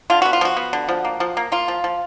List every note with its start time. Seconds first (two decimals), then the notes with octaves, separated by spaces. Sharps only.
0.10 D3 F4
0.22 B3 F#4
0.33 F4
0.41 F3 F#4
0.57 B3
0.73 D3
0.89 F3
1.05 A#3
1.20 F3
1.37 A#3
1.52 A#3 F4
1.68 F3
1.84 F3